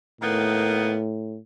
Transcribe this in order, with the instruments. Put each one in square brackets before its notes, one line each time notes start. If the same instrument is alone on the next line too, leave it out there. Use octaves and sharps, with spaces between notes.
[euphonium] A2 [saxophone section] D#3 A#3 B3